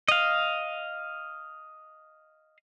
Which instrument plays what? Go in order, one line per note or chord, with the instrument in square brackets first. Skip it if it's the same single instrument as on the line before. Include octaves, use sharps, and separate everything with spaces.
[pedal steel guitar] D#5 F5